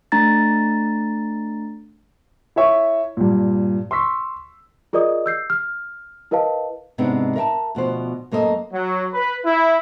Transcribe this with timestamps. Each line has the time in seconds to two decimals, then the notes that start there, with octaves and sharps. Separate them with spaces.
0.12 A3 D4 A#5 A6
2.56 E4 C#5 E5 C#6
3.17 G2 A#2
3.91 C6 C#6 E6 B6
4.93 F4 G#4 A#4 D5 D#5 D#6
5.26 E6 G6 C7
5.50 F6
6.31 E4 A#4 B4 D#5 F5 A5
6.98 G#2 C3 G#3 B3 C4 D4
7.36 A#4 E5 G5 A5
7.75 D2 B2 F3 C5
8.32 F#2 A#3 A4 A#4 D#5
8.73 F#3
9.13 B4
9.45 E4